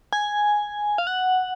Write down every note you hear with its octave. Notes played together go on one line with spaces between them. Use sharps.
G#5
F5
F#5